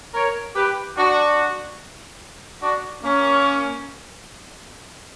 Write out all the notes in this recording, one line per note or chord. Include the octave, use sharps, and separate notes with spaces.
A#4 C#5
G4 B4
D4 F#4
D4 F#4
A#3 C#4